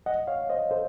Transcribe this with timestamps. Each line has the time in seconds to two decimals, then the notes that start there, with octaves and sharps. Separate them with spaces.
0.06 D#5 F#5
0.27 C#5 F5
0.49 C5 D#5
0.71 A4 C5